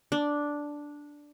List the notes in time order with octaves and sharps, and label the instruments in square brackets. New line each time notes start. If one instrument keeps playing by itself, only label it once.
[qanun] D4